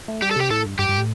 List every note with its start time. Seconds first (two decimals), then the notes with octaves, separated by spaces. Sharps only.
0.08 A3
0.22 G3 G4
0.31 A4
0.36 C3 G4
0.50 A2 A4
0.65 G2
0.79 G2 G4
0.89 G2
0.98 A2